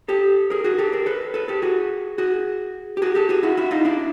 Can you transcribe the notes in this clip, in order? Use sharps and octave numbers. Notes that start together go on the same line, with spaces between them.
G4 A4
G#4 A#4
F#4 G#4
G4 A4
G#4 A#4
A4 B4
A4 B4
G4 A4
F#4 G#4
F#4 G#4
G4
F#4 G#4
G4 A4
F#4 G#4
E4 F#4
E4 F#4
D#4 F4
D4 E4